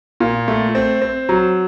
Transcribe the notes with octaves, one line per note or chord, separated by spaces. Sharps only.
A#2
A3
C4
C4
F#3